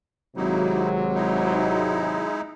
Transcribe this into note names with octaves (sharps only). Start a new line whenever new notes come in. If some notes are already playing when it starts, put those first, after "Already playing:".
G#1 C3 F#3 A#3 D#4 E4
G#3 D#4 E4